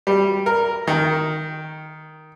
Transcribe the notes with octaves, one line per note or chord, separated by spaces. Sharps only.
G3
A#4
D#3